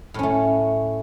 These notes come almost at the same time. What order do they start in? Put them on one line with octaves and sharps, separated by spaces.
A2 C#4 A3